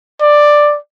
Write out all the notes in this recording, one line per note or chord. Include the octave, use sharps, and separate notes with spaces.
D5